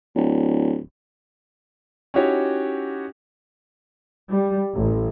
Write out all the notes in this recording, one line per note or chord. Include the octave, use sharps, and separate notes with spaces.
D1
C#4 D#4 E4 F#4 G4 C#5
G3
A1